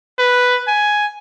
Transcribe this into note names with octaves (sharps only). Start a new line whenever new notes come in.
B4
G#5